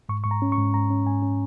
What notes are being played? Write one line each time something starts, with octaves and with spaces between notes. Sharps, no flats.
G#2 C#6
G#2 C#6
A#5
C#4
C#6
G#2
G#2 A#5
C#4
G#2 G#5
C#4